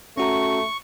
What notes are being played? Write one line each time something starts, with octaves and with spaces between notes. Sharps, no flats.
A3 C#4 F#4 A#5 C#6